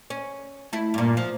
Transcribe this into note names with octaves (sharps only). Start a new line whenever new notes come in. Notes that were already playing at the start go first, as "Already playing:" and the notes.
C#4
A3 E4
G2 A#2
F3